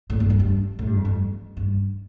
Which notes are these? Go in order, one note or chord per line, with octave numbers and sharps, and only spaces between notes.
A2
G2
F2
G2
A2
G2
F2
G2
G2